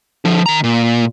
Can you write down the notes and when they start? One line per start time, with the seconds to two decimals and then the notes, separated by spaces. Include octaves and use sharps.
0.25 D3 F3
0.46 D#3 A#5
0.64 A#2